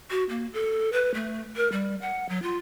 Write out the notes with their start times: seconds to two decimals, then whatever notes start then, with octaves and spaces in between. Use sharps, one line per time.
0.11 F#4
0.30 A#3
0.53 A4
0.93 B4
1.14 A3
1.56 A#4
1.72 G3
2.02 F#5
2.29 F#3
2.42 F4